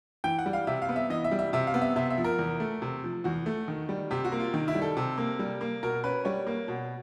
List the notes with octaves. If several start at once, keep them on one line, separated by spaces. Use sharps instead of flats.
E3 G5
F#5
G3
F5
C3 E5
F5
B3
E5
E3 D#5
E5
G3
E5
C3 E5
F5
B3
E5
C3 E5
E5
F3
A#4
E2
A3
C3
F3
E2 F#4
A3
D#3
G3
C3 G4
F#4
A#3
F4
D#3
E4
G3
A4
C3
A#3
G3
A#3
B2 A#4
C#4 B4
G3 C#5
A#3
B2